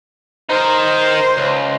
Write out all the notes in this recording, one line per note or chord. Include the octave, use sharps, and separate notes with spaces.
D#4 A#4 C5
C#2